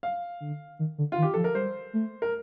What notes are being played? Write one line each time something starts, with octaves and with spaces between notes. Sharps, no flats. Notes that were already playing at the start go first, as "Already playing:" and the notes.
F5
D3
D#3
D3
F4
D#3
G4
F3 A4
A#4
G3 C5
A3
A#4